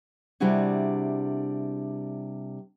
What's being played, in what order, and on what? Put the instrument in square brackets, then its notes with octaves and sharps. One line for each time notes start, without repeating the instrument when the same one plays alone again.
[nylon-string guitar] C3 G3 D4 E4 F#4 G#4